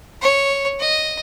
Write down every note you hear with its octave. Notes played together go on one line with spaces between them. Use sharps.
C#5
D#5